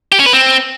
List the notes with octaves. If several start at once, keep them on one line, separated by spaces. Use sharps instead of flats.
G4
C#4
B4
C4